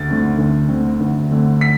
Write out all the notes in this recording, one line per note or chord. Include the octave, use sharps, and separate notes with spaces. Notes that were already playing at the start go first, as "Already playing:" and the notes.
Already playing: D2 A6
D3 A3 C4
D2
D3 A3 C4
D2
D3 A3 C4
B6